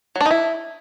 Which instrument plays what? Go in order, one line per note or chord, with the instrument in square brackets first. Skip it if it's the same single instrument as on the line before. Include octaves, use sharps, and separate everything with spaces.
[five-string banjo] F#3
D4
D#4
E4